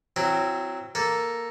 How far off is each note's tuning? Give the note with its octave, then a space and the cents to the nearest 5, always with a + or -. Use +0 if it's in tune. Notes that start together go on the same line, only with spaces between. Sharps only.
F#3 +0 C4 +0 E4 +35
A#3 +0 A4 +0